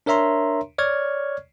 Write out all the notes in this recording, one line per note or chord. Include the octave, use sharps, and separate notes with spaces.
D4 A#4 C#5 E5 A#5 C6
C#5 D5 C#6 F6 G#6